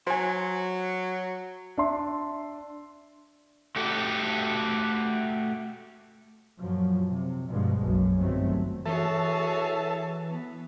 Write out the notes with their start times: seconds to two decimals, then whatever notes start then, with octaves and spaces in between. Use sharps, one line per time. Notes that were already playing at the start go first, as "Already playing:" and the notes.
0.07 F#3 C5 G#5
1.78 D4 E5 C6
3.76 A3 F#4 G4 A4
6.59 F#2 A#2 F3 F#3
7.06 C3
7.48 G2 B2 F3 G#3
7.82 F#1 B1 F#2
8.18 G1 D#3 F#3 A3 C4
8.86 E3 F#4 G#4 A4 C#5 E5 A5
10.30 B3